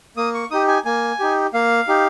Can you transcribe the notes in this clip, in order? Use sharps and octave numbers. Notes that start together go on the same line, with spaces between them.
A#3 D#6
C#6
D#4 G4 D#6
G#5
A#3 G#5
D#4 G4
A#3 F5
D#4 G4